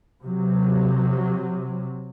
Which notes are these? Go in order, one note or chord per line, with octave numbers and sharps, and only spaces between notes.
C3 F#3